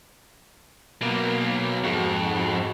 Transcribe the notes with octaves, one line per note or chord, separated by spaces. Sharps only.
B2 F#3 A#3
F2 G#2 F#4